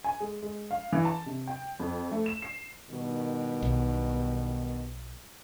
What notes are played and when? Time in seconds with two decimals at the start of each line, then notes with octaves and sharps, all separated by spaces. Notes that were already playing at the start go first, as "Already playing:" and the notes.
0.04 G#5
0.20 G#3
0.43 G#3
0.71 F5
0.93 E3
1.05 A5
1.26 C3
1.47 G5
1.80 F2
2.12 A3
2.26 E7
2.42 C7
2.89 G2 B2 D#3
3.63 B1